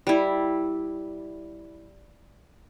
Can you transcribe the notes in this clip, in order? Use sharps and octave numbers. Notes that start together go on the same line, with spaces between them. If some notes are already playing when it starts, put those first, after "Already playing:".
G3 E4